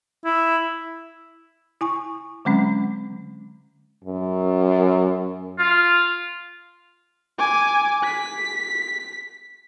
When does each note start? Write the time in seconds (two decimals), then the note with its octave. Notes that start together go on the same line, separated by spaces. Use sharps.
0.25 E4
1.81 E4 G#5 C#6
2.45 D3 F#3 G#3 C4 C#4
4.04 F#2
5.59 F4
7.38 G#5 D6
8.04 B6